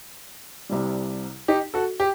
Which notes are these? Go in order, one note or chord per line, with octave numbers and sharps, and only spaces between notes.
C2 C3 G3
D#4 G4
F#4 A4
G4